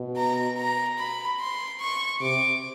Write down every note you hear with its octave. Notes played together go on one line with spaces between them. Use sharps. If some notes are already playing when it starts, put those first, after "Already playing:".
Already playing: B2
A#5
A#5
B5
C6
C#6
C3 D6